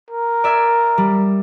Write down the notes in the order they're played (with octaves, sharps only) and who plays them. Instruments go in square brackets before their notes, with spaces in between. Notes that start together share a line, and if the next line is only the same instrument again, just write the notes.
[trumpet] A#4
[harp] D5 E5 G#6
G3